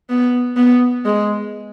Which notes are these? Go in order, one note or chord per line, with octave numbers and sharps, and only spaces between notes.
B3
B3
G#3